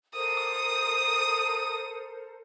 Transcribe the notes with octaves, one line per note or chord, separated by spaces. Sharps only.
A4 A#4 C5 D#6